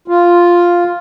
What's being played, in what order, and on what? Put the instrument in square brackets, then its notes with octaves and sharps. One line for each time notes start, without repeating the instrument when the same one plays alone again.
[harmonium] F4